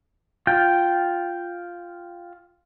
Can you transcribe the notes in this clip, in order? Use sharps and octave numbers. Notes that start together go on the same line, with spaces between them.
F4 G5